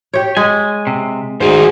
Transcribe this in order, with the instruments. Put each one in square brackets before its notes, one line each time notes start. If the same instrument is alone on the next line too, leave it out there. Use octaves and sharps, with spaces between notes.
[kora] G4 C#5
[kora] G#3 [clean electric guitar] G#5
[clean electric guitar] C3
[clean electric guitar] G#2 D#3 [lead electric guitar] F#4 C5 [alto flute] G#4